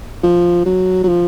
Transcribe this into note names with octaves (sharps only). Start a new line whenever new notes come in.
F3
F#3
F#3
F3